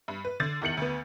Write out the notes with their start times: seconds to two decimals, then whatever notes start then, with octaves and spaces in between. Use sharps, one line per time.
0.08 G2
0.25 B4
0.40 D3 A6
0.61 E2 D#3 G6 C#7 F#7
0.77 D2 B3